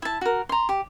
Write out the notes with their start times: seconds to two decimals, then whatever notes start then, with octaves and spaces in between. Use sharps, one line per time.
0.02 E4 A5
0.21 F#4 A#4
0.49 A#5 C6
0.69 G4